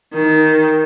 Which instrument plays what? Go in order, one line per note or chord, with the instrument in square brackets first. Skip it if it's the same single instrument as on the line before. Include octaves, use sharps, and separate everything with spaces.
[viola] D#3